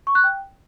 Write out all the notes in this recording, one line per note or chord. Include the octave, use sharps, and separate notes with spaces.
C#6
F#6
G5